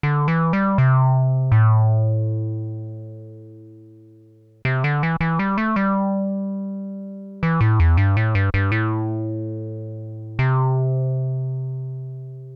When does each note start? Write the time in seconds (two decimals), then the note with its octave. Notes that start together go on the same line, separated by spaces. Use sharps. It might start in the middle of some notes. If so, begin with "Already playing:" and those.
0.03 D3
0.28 E3
0.53 G3
0.78 C3
1.52 A2
4.65 C3
4.84 D3
5.03 E3
5.21 E3
5.39 G3
5.58 A3
5.76 G3
7.43 E3
7.61 A2
7.80 E2
7.97 G2
8.17 A2
8.35 G2
8.54 G2
8.72 A2
10.39 C3